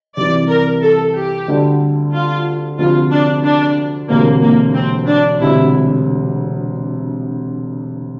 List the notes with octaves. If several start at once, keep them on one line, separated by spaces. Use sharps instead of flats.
C2 C3 E3 D5
A#4
A4
G4
D2 D3 G3
F4
D2 C3 F3 F4
D4
D4
E1 D2 C3 A#3
A#3
C4
D4
E1 D2 C3 E4